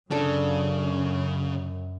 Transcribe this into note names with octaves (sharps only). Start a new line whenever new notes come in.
F#2 C#3 D4 A4